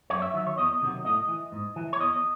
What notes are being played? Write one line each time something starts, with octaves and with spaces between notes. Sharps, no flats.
F#2 C#5
E5
D#3 F#3 E5
C#5
E2 D#5
C3 D#3 F#3
A2 D#5
E3
G#2
E3
C#5
E2 D#5